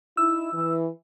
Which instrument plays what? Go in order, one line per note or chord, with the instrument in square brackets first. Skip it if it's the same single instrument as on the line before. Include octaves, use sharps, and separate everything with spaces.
[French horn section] D#4 E4 [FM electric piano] E6
[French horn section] E3